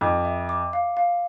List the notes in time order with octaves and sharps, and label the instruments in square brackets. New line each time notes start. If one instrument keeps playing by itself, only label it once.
[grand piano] F2 [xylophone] D6
[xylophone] E5
D6
F5
F5